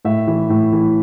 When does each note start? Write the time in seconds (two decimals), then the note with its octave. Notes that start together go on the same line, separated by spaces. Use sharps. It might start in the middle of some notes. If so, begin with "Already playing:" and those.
0.05 A2 E5
0.27 E3
0.50 A2
0.72 E3